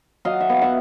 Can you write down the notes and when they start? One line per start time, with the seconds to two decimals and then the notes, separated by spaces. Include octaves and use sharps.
0.25 F#3 D#5 F5
0.41 E5
0.49 B3 F5
0.61 E5 F#5